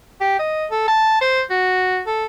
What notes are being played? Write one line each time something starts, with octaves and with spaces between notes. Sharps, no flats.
G4
D#5
A4
A5
C5
F#4
A4